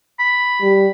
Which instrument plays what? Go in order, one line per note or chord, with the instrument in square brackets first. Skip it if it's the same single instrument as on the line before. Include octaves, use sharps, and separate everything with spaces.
[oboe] B5
[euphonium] G3